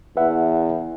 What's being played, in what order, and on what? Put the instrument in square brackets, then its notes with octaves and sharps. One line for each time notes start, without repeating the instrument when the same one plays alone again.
[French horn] E2 [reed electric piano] B4 E5 F#5